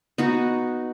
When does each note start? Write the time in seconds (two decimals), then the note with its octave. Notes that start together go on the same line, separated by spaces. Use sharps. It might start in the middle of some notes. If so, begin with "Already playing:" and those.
0.18 B3 D#4 F#4